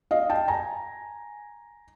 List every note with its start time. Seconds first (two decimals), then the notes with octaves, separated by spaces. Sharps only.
0.11 D#5 F5
0.30 G5 A5
0.48 G#5 A#5